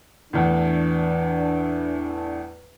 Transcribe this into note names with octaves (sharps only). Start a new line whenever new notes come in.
E2 A2 E3 D4